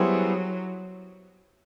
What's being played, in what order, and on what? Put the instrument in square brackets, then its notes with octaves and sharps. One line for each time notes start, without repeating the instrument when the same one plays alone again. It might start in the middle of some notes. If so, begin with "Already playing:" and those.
Already playing: [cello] F#3 [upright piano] G3 B3 E4 G#4 C5